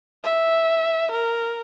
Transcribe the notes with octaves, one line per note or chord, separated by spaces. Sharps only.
E5
A#4